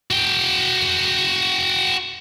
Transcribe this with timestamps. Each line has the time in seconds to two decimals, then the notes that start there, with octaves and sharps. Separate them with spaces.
0.10 F#4 G5